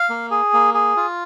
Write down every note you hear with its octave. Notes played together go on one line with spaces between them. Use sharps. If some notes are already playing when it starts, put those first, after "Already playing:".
Already playing: F5
A#3
G#4
A#3
G#4
F4